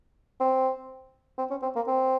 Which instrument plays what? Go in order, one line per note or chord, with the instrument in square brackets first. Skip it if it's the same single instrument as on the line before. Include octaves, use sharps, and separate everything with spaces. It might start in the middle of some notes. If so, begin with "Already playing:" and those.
[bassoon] C4
C4
C#4
C4
A#3
C4